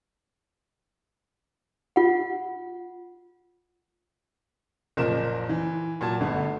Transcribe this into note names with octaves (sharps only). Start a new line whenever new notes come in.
F4 F#5
F#1 A#2 F3 A#4 E7
E3
A#2 F#3 A5 G#6
G1 D3 A3 B3